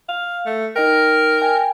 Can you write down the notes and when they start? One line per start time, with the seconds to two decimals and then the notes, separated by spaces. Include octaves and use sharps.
0.09 F5
0.46 A3
0.76 D#4 A#4 D#5 G5
1.42 G5 G#5